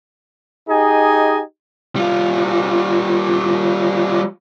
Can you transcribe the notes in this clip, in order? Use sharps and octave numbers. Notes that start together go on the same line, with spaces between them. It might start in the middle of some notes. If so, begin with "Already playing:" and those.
D#4 G4 G#4 D#5 G#5
G3 F4